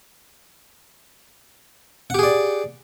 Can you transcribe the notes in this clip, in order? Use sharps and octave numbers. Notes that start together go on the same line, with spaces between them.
G4 G#4 D5 F#5